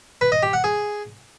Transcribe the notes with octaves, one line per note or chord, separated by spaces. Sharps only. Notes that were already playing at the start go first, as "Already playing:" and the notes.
B4
D#5
G4
F#5
G#4